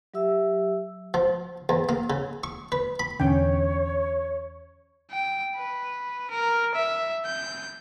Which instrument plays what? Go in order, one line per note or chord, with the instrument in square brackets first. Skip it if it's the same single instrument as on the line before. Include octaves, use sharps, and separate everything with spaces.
[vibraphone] F#3 G4 E5 E6
[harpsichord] F3
E2
A#3
C#3
C#6
B4
B5
[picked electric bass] E2 B2 D3 [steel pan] C#4 G5 [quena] C#5
[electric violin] G5
B4
A#4
E5
G6